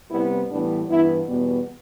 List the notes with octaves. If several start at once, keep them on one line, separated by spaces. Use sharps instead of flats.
C3 G3 B3 E4
A2 E3 G3 B3 D4
G2 E3 B3 E4
E2 B2 G3 B3